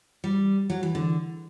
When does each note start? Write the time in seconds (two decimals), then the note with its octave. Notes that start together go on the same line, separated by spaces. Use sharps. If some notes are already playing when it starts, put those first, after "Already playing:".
0.24 G3
0.70 F#3
0.83 E3
0.95 D3